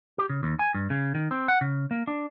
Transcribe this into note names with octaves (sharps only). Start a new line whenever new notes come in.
G4
C#3
D#2
G#5
G2
C#3
D#3
C4
F#5
C#3
A#3
D4